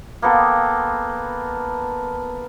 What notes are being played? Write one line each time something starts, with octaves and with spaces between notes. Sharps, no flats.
A#3 B3 A4 G5